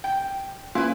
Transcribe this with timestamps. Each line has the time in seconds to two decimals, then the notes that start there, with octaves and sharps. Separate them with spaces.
0.04 G5
0.75 A#3 C#4 E4 F4 B4